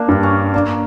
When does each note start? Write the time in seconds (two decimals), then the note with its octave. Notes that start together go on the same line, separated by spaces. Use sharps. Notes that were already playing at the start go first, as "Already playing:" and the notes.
Already playing: A#3 D4
0.09 G2
0.23 C#4
0.54 A#3 D4